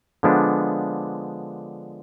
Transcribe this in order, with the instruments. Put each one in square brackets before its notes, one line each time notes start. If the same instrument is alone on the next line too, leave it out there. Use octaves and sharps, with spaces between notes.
[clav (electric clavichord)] D3 F3 G#3 B3 D4